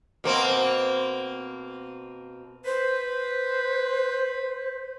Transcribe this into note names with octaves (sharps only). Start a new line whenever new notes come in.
B2 A#3 C4
B4 C5